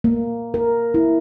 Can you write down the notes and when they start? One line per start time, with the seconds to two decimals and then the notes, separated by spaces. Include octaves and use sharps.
0.04 A#3
0.54 A#4
0.94 E4